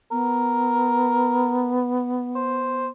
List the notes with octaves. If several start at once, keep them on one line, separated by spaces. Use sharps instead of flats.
B3 A#4
C5